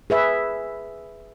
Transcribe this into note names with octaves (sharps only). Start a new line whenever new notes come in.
G#4 B4 E5